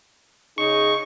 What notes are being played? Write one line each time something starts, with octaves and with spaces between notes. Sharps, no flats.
C#3 D#4 G#4 C#6